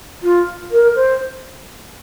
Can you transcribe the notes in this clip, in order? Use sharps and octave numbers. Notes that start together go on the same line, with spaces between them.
F4
A#4
C5